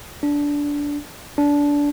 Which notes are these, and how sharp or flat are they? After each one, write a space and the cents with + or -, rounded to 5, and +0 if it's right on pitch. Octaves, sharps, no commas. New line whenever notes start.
D4 -15
D4 -20